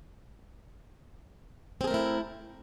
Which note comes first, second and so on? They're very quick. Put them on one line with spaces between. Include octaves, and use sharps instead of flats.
C4 G#4 A#4 A3 E4